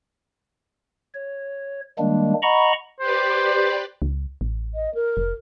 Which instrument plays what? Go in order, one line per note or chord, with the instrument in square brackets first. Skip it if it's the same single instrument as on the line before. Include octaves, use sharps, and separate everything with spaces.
[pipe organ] C#5
D#3 G3 G#3 A#3 D4
D#5 F#5 A#5 B5 C#6
[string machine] G4 B4 D5 [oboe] C5
[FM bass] C#2
A1
[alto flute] D#5
A#4
[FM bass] F1